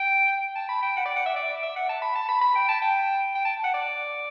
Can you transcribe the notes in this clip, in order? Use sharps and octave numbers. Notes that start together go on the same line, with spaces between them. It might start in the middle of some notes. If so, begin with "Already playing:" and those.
Already playing: G5
A5
B5
G5
F#5
D5
F#5
E5
D5
D5
E5
F#5
A5
B5
A5
B5
B5
G5
A5
G5
G5
A5
F#5
D5